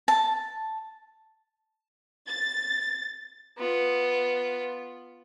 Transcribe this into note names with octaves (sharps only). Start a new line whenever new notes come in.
A5
A6
B3 F4